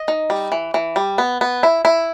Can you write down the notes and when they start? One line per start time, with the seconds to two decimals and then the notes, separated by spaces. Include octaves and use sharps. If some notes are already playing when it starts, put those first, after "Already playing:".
Already playing: D#5
0.08 D#4
0.30 G3
0.52 E3
0.74 E3
0.96 G3
1.18 B3
1.41 B3
1.63 E4
1.85 E4